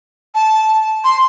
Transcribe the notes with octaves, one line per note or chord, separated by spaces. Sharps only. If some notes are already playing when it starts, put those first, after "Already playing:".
A5
C6